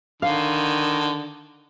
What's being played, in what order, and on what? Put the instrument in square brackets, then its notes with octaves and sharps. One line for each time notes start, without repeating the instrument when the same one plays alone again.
[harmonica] D3 [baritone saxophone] D#3 [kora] F5